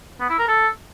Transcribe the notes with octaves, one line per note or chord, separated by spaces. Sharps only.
B3
E4
A#4
A4